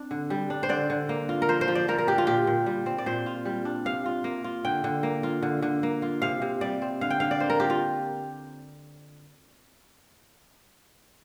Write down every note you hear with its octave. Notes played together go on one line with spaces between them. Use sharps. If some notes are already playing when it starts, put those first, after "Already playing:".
Already playing: C4 D4
D3
G3
D4
C5
D3 D5
D3
A#3
F4
A#4
F3 C5
C5
F3
D5
F3 A#4
A#4
D4 G4
F4
A#2 G4
A#2
G3
C4
D5
A#2 C5
F4
G3
D4
C3 F5
F4
A#3
F4
D3 G5
D3
A#3
F4
D3
D3
A#3
F4
C3 F5
C3
G3 D5
C4
D3 F5
G5
D3 F5
D5
A#3 C5
A#4
F4 G4
F4